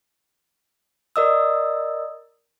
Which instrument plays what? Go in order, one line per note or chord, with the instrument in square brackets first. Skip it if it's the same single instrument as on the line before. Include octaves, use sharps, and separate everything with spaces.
[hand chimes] A#4 D5 D#5 D#6 E6